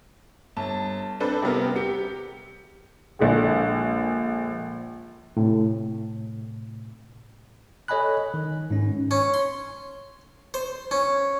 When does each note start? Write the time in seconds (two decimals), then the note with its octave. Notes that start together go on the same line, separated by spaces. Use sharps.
0.57 G1 A5
1.20 C4 D4 A4 B4 C5
1.42 C3 G3 B3 A#4
1.76 G4 C#7
3.19 A#1 D3 G#3
5.37 A2 C3
7.88 A4 C#5 D#5 G#5 B5 F#6
8.34 D#3
8.70 G#2 C#4
9.11 C#4
9.34 C6
10.54 C5
10.91 C#4